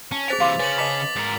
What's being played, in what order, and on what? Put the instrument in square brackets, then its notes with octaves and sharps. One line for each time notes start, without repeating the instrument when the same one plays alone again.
[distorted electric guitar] C#4 [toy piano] A5
[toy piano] G#4 C5 G#5 [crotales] A6 B6 F7
[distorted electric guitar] C3 E3 [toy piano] F5 C6 D6
[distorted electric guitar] C#3 C#4 [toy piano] B4 [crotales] A6 F#7
[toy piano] D#5 A5 B5 [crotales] D6 B6
[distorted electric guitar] G#2 A#4